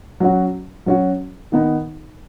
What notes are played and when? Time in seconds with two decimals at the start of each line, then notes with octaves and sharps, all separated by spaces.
0.20 F#3 C#4 F#4
0.86 F#3 C#4 F#4
1.52 D#3 B3 D#4